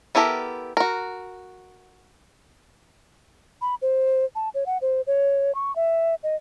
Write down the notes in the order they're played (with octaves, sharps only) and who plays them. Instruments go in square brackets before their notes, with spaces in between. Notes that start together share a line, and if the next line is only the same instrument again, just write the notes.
[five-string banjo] B3 E4 G4 A4 A#4
F#4 A#4
[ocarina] B5
C5
A5
C#5
F#5
C5
C#5
C#6
E5
D#5